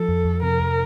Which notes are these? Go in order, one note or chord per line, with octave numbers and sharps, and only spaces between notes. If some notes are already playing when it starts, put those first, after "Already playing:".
Already playing: F3 A4
F2
F2
C3 A#4
F2